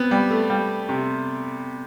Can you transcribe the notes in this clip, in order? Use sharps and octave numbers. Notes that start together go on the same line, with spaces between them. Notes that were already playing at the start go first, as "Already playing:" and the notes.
Already playing: B3 C4
G3
A3
G3
C3